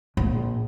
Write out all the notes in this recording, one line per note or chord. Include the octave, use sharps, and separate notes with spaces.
A#1